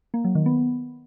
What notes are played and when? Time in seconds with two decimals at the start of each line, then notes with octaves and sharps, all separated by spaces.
0.14 A#3
0.24 F#3
0.35 D#3
0.46 B3